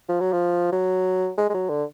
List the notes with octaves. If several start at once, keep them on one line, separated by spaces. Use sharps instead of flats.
F3
F#3
F3
F#3
G#3
G#3
F#3
D3